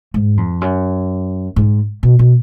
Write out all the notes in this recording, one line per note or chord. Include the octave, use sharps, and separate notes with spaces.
G#2
F2
F#2
G#2
B2
B2